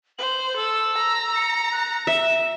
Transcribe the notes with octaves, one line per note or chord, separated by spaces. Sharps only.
C5 F#7
A4 E6
A#5
C#7
F#6
E5 E7